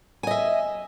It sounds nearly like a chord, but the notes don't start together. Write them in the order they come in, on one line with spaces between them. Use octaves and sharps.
G#5 D#5 E5